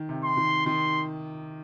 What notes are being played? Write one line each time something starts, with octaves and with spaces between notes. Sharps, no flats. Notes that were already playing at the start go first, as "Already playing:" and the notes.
Already playing: D#3
C3
C6
D#3
D#3 C6